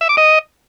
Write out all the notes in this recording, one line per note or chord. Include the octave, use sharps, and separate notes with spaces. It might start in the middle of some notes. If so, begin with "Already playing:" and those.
E5
D6
D#5